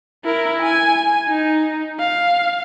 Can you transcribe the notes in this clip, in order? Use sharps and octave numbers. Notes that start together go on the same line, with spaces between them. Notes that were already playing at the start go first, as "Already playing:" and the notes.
E4 A#4
G#5
D#4
F5